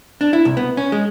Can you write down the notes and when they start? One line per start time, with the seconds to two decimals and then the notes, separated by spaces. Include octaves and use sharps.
0.21 D4
0.33 E4
0.45 C2
0.57 B3
0.77 C#4
0.92 G#3